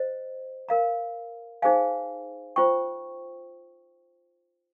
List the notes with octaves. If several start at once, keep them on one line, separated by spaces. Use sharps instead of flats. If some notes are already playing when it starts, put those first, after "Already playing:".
Already playing: C5 D#5
A#4 F5 A#5
D#4 G#4 C5 F5 G#5
F4 C5 G5 C#6